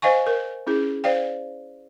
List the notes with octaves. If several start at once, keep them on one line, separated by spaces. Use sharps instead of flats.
C5 D#5 F5 G#5 C#6
A#4
C#4 E4 G#4
C5 D5 F5 G5